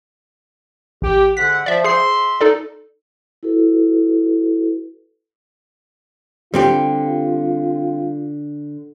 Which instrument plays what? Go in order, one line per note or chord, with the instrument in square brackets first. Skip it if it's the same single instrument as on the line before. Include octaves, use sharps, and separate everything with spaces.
[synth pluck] A1 [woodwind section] G4
[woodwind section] G#2 D3 F#5 [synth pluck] B6
[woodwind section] F3 [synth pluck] D5 E5
[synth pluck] G#4 C5 C7 [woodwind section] E5 C6
[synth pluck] D#4 A4 D5
[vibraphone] E4 F#4 A4 B4
[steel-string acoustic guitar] D3 [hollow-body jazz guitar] G3 C4 G4 [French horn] F4